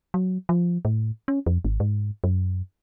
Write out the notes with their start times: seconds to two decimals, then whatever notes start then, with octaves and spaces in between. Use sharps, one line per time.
0.14 F#3
0.49 F3
0.85 A2
1.28 C#4
1.46 F2
1.65 G#1
1.80 G#2
2.24 F#2